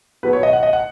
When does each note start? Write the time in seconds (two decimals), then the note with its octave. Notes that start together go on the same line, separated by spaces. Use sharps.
0.23 B2 F#3 B3 B4
0.33 C#5
0.43 D#5
0.53 F#5
0.63 D#5
0.73 F#5